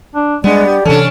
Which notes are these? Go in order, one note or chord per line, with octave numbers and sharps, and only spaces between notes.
D4
G3 G#3 B3 D4 D5
G4
C3 E3 C#4 D4 A4